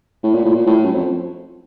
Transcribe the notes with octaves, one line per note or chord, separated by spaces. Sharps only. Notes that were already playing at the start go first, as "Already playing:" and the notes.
A2
A#2
A2
A#2
A2
F#2
F2